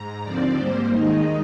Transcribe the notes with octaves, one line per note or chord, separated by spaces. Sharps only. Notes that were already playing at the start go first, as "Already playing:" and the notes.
Already playing: G#2 A#5
D#2 D3 F3 C4 D5
G#2 G3 A#3 C5
D#2 D#3 G#3 D#4 D#5